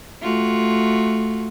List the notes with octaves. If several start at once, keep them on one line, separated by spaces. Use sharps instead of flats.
A3 F4 F#4